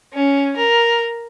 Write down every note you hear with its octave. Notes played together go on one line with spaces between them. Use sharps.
C#4
A#4